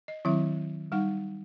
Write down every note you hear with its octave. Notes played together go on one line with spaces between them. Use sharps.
D#5
D#3 F#3 C4 E4 E5
G3 D#4 F#5